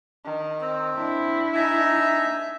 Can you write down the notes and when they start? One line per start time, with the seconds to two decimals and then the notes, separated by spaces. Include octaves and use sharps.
0.25 D#3
0.61 C4
0.98 D4 E4
1.54 D#4 E5 G#5 A#5